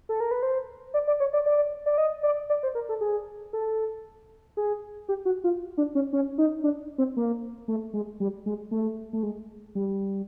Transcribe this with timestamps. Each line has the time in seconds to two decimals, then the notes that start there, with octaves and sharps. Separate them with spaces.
0.09 A4
0.20 A#4
0.31 B4
0.43 C5
0.94 D5
1.07 D5
1.20 C#5
1.33 D5
1.46 D5
1.86 D5
1.98 D#5
2.23 D5
2.50 D5
2.63 C5
2.75 A#4
2.89 A4
3.01 G#4
3.53 A4
4.57 G#4
5.09 G4
5.25 F#4
5.44 F4
5.77 D4
5.95 C#4
6.13 C#4
6.38 D#4
6.64 D4
6.98 C4
7.17 A#3
7.68 A3
7.94 G#3
8.20 G3
8.46 G#3
8.71 A3
9.13 A3
9.23 G#3
9.75 G3